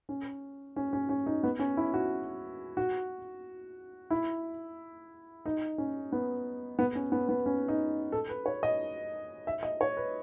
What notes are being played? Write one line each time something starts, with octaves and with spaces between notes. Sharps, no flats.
C#4
C#4
C#4
C#4
D#4
B3
C#4
E4
F#4
F#4
E4
D#4
C#4
B3
B3
C#4
B3
B3
C#4
D#4
A4
B4
C#5
D#5
E5
D#5
C#5
B4